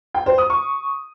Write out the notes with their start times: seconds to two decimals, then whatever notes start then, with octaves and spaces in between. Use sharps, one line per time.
0.14 G5
0.26 C5
0.38 D#6
0.50 C#6